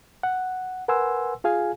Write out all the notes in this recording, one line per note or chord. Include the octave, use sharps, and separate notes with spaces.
F#5
A#4 B4 F#5 G#5 C6 E6
F4 G#4 F5 G#5